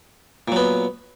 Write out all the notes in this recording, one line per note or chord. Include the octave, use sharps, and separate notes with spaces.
A#2 F#3 B3